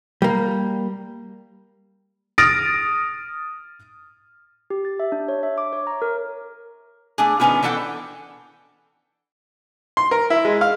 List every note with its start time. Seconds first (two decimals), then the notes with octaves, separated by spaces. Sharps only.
0.22 G3 A#3
2.38 D#6 F6 A6 A#6 D7
4.70 G4
4.85 A6
5.00 E5
5.12 D4
5.28 C#5
5.43 E5
5.58 D6
5.73 C#5
5.87 A#5
6.02 A#4
7.18 A3 D4 G#4
7.40 D#3 F3 B3 C#4 E4 F4
7.63 E3 D4 A4 F#5 G5
9.97 C6
10.11 A#4
10.30 E4
10.45 G#3
10.61 F5